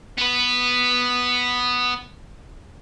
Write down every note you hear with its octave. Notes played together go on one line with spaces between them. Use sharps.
B3 B4